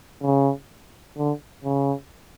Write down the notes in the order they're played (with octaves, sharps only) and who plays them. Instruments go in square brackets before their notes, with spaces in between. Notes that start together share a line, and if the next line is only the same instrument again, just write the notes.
[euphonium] C#3
D3
C#3